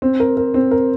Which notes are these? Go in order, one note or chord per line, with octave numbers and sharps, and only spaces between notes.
C4
A#4
A#4
C4
A#4